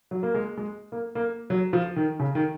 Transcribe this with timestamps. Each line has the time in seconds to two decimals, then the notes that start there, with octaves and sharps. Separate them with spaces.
0.11 F#3
0.23 A#3
0.34 G#3
0.58 G#3
0.92 A#3
1.15 A#3
1.50 F#3
1.73 F3
1.96 D#3
2.19 C#3
2.35 D#3